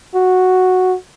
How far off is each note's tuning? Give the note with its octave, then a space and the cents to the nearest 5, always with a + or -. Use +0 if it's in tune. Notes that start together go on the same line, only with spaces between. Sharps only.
F#4 -5